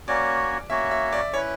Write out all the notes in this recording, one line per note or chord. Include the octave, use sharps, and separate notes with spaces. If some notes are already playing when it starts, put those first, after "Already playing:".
A#3 C#4 F#4 C#5 D5
A#3 C#4 F#4 C#5 E5
E5
D5
C#4 E4 B4 C#5